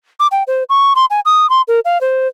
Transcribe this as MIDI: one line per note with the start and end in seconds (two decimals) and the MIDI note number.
0.20 0.27 86
0.31 0.43 79
0.47 0.64 72
0.69 0.93 85
0.96 1.05 84
1.10 1.20 80
1.25 1.49 87
1.50 1.62 84
1.68 1.80 70
1.85 2.00 77
2.01 2.28 72